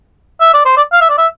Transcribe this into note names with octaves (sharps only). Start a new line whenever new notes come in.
E5
D5
C5
D5
F5
E5
D5
E5